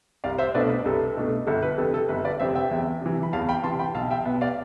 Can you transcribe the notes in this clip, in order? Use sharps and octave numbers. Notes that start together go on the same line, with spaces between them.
C2 D5 F5
C5 E5
B2 A3 D4 B4 D5
B4
C2 A4
B2 A3 D4
G1 A4
B4
F2 C3 A4
A4
G1 B4
B4 D5
F2 C3 C5 E5
E5 G5
E2
C3 E3
B5
E2 F5 A5
G5 B5
C3 E3 A5 C6
G5 B5
B1 F5 A5
E5 G5
B2 B3
D5 F5